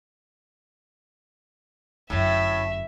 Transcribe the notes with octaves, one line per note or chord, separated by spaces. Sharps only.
G1 F#2 A2 E5